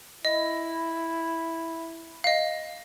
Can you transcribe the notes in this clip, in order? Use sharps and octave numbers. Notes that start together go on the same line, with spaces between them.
E4 D#5
D#5 F5